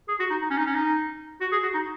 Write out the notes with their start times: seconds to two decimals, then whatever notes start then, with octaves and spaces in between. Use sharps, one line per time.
0.08 G#4
0.19 F#4
0.31 D#4
0.42 D#4
0.50 C#4
0.58 D#4
0.66 C#4
0.75 D#4
1.41 F#4
1.52 G#4
1.63 F#4
1.74 D#4